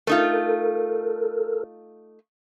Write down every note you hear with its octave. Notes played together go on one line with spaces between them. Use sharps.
A3 D#4 F4 A4 A#4